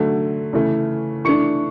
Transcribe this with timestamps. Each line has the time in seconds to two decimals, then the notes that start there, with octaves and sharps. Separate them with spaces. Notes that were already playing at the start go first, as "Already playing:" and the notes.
Already playing: D3 F#3 A3
0.53 C#3 E3 A3
1.25 E3 A3 D4 C#6 C#7